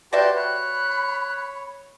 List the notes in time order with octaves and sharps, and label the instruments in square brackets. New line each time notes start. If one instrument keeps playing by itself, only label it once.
[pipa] F#4 D5 E5 [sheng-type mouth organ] G4 A5 C6 [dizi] B4 [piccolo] G6
[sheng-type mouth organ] C#5 [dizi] B5 [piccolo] F#6